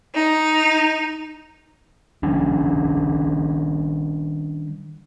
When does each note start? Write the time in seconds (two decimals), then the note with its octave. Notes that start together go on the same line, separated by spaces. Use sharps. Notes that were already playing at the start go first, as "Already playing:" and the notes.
0.15 D#4
2.23 D#3 G3 C#4 D4